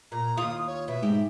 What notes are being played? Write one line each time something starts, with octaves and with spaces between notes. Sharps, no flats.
A#2 A#5
D#2 F4 D#6
C#5
B2 E5
G#2 G4